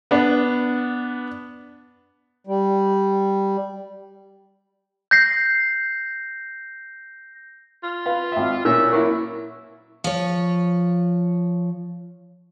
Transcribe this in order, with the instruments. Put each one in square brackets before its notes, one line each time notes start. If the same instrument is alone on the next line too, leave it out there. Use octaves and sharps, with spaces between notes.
[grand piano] B3 D4
[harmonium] G3
[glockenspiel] G6 A#6 C7
[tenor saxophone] F4
[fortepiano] B4 F5
G#1 E5
[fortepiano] A#2 C#4 [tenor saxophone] E5
[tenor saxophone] F#3 [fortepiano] A#3 E4
[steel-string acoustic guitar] F3 C#5